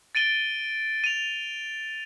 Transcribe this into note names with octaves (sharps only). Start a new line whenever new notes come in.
A6 D7 D#7 G7
D#7 F7